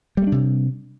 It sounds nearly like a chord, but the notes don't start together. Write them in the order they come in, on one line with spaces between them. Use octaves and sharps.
G3 A3 D4 C3